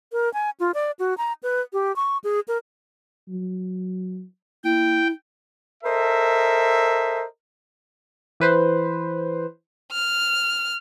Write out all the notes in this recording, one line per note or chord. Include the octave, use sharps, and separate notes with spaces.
A#4
G#5
F4
D5
F#4
A#5
B4
G4
C#6
G#4
A#4
F#3
A#3 E4 G5
A4 A#4 C5 D#5 E5
E3 B4 C5
F6